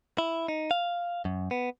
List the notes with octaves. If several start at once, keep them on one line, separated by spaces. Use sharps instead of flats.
E4
D#4
F5
F#2
B3